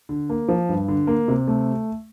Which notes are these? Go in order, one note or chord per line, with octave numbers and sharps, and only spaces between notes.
D3
A#3
F3
G2
D3
A#3
C3
A3